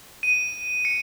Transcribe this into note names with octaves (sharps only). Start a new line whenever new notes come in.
D#7
C#7